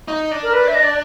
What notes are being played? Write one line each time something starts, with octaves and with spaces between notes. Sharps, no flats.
D#4
D4
A#4
B4
E5
D#5
D5